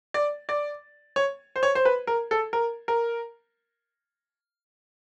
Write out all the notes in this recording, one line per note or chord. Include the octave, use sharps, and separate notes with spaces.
D5
D5
C#5
C5
C#5
C5
B4
A#4
A4
A#4
A#4